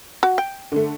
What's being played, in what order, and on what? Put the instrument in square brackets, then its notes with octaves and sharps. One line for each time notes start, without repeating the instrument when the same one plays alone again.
[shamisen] F#4
G5
[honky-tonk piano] D3 A3